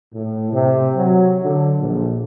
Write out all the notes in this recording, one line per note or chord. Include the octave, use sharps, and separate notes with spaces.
A2
C3
F#3
D3
A#1